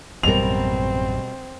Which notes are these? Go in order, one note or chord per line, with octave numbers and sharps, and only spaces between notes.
A1 F#2 B2 G3 C4 A#4 F7